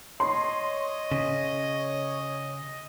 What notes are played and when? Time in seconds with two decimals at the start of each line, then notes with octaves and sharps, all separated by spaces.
0.20 C#5 D#5 C6
1.12 C#3